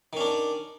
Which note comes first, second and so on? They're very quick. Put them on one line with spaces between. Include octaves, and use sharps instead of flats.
D#3 C#4 D4